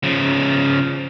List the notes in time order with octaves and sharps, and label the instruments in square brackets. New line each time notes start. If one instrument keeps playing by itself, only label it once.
[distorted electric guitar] C#3 F3